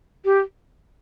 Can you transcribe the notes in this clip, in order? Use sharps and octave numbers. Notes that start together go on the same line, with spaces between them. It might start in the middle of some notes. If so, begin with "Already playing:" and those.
G4